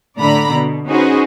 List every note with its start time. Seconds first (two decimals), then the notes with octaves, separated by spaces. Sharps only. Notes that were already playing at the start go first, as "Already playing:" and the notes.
0.18 A2 D3 D5 A#5 B5
0.51 B2
0.88 C#4 D#4 F#4 G#4 B4 C5